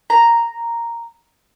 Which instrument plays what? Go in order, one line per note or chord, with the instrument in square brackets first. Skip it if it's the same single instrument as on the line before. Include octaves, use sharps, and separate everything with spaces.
[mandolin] A#5